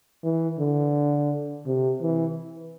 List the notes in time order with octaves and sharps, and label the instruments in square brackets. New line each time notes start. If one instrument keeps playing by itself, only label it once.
[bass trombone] E3
D3
C3
E3